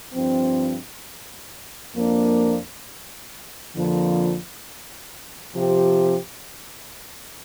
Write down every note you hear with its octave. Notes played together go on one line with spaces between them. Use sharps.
G2 F3 C4
F2 F3 A#3 D4
F2 D3 F3 A#3
C3 F3 C4 G4